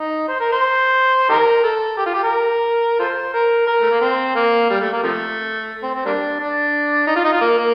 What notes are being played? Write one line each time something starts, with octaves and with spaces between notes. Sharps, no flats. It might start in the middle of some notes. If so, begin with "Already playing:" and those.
Already playing: D#4
C5
A#4
C5
D#4 G4 A#4
A4
G4
F4
G4
A#4
F4 A4 C5
A#4
A#4
A3
A#3
C4
A#3
G3
A3
A#3
C3 F3 A3
C4
C4
G3 A#3 D4
D4
D#4
F4
D#4
F4
A#3
A#3